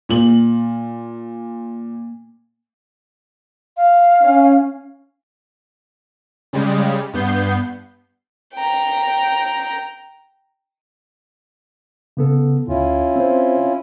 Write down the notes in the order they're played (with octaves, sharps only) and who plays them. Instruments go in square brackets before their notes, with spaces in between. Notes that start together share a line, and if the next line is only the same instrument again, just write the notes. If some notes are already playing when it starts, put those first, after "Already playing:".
[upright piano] A#2 F#7
[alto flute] F5
[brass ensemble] C#4
[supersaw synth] C#3 G3 G#3
G2 B3 G6 C7
[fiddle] G5 A#5
[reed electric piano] C#3 B3 A4
[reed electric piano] D2 [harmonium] C#4 E4 F4
[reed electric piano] C4 C5